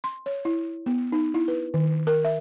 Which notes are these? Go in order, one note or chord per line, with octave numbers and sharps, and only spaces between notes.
C6
C#5
E4
B3
D#4
E4
B4
D#3
A#4
E5